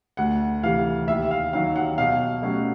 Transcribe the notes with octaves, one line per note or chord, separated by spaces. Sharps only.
D2 F#5
C3 E3 F5
D#2 E5
F5
D#3 F#3 F5
F#5
B2 F5
F#3 A3 C#4